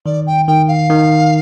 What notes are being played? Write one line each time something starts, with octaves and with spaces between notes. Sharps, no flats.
D#3 D5
G5
D#3 G5
F5
D#3